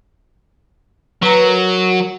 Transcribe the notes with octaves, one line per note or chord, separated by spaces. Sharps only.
F#3 B4 A#5
A#4